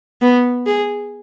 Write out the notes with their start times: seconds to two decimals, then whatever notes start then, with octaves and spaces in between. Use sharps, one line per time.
0.21 B3
0.66 G#4